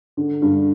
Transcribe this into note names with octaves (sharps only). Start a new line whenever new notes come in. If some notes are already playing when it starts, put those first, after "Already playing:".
D3
G2